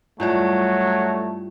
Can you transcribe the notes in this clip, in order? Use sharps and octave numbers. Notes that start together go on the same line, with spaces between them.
G2 F#3 A3 E4 F4 D5